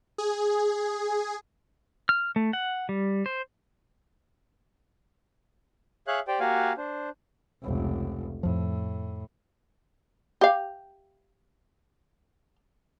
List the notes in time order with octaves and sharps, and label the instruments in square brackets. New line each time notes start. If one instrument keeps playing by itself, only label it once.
[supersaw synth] G#4
[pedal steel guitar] F6
A3
F#5
G3
C5
[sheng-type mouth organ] G#4 C#5 E5 F5 F#6
G4 C5 D5 G5
A#3 F#4 G4 F5 F#5 G#5
D4 C5
[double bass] F1 C#2
[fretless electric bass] F2 F3 [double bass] A2
[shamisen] G4 F5